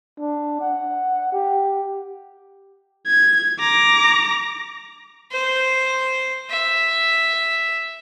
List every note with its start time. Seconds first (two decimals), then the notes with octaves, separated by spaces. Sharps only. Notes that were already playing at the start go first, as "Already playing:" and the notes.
0.19 D4
0.61 F#5
1.33 G4
3.07 G#6
3.60 A#5 D6
5.32 C5
6.50 E5